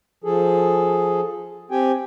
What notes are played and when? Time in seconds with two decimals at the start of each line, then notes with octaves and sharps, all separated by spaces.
0.24 F3 G#4 A4
1.71 C4 G4 G5 G#5